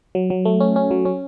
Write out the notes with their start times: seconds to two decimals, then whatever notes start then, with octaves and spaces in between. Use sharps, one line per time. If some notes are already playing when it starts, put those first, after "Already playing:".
0.15 F#3
0.30 F#3
0.45 A3
0.60 C#4
0.76 C#4
0.91 F#3
1.05 C#4